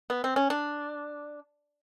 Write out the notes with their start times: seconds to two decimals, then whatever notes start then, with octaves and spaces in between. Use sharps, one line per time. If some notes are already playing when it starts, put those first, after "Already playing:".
0.10 B3
0.24 C4
0.36 C#4
0.50 D4